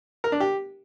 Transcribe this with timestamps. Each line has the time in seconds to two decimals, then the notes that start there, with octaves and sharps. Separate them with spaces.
0.24 A#4
0.32 D4
0.40 G4